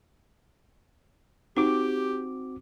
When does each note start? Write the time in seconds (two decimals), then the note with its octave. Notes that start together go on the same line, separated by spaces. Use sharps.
1.57 C4 D#4 F#4 G4 D6